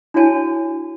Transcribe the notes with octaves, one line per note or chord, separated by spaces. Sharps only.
D4 E4 F#4 C#5 G#5 A5